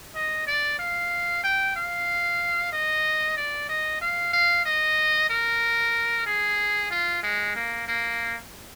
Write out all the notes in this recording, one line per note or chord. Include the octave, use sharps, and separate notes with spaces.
D#5
D5
F5
G5
F5
D#5
D5
D#5
F5
F5
D#5
A#4
G#4
F4
G#3
A#3
A#3